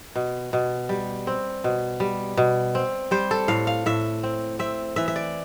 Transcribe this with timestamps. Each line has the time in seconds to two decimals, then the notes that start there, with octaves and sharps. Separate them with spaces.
0.15 B2
0.53 B2
0.89 G3
1.27 C4
1.64 B2
2.00 G3
2.37 B2
2.75 C4
3.11 G3 C5
3.31 A4
3.48 A2 F5
3.67 F5
3.86 A2 E5
4.23 C4
4.59 C4 E5
4.96 E3 E5
5.08 E5
5.16 D5